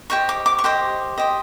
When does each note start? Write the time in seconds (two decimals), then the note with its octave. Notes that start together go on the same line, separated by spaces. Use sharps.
0.10 G4 C5 D#5 C#6
0.29 D6
0.46 D6
0.59 C#6
0.64 G4 C5 D#5 C6
1.18 G4 C5 D#5